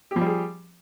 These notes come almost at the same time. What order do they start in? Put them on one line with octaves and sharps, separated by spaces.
G4 F3 G3 G#4